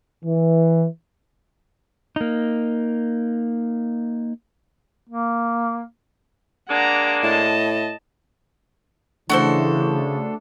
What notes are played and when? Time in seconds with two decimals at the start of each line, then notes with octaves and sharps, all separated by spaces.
0.24 E3
2.16 A#3 D#4
5.09 A#3
6.69 G#3 A#3 D4 F#5 A#5
7.23 A2 D#5 A5
9.30 C#3 E3 A3 D4 F#4 A4 C5